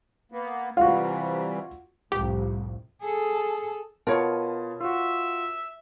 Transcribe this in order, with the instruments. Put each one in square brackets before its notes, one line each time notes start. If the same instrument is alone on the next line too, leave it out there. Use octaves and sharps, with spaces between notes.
[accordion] A#3 B3
[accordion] C3 E3 G3 [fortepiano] F4 F#4
[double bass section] C2 F2 A2 [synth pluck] G4
[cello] G#4 A4
[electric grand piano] B2 F4 A5 [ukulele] A#4 C#5
[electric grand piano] F4 F#4 [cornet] E5